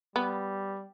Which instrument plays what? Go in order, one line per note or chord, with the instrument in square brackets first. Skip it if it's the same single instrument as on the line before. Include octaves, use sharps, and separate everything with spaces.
[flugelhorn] G3 [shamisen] B3